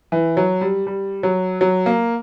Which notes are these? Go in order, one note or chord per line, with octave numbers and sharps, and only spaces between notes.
E3
F#3
G3
G3
F#3
F#3
A#3